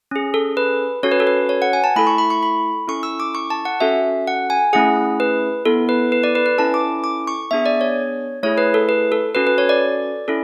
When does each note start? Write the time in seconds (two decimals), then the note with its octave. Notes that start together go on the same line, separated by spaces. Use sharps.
0.11 C#4 G#4
0.34 A4
0.57 B4
1.03 C#4 F#4 A4 C#5
1.12 B4
1.20 A4
1.27 B4
1.49 C#5
1.62 F#5
1.73 G#5
1.84 A5
1.96 A3 E4 A4 B5
2.07 C#6
2.18 B5
2.30 C#6
2.43 B5
2.88 C#4 E4 A4 C#6
3.03 E6
3.20 D6
3.35 C#6
3.50 A5
3.65 F#5
3.80 C#4 F#4 A4 E5
4.27 F#5
4.50 G#5
4.73 A3 C#4 E4 G#4 F#5
5.20 B4
5.65 B3 E4 A4
5.89 B4
6.12 B4
6.23 D5
6.35 B4
6.46 B4
6.58 C#4 E4 A4 A5
6.74 D6
7.04 D6
7.27 C#6
7.51 B3 D4 G#4 E5
7.66 D5
7.81 C#5
8.43 A3 E4 G#4 C#5
8.58 B4
8.74 A4
8.89 B4
9.12 A4
9.35 C#4 F#4 A4 B4
9.47 B4
9.58 C#5
9.69 D5
10.28 C#4 E4 A4